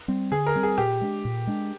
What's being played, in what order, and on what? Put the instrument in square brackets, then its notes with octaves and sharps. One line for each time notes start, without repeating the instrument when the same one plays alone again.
[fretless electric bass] G3 C4
[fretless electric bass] D3 [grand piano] G#4
[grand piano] A#4
[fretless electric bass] G3 C4
[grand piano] G#4
[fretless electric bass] A#2 [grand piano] G4
[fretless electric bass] G#3 D4
A#2
G#3 D4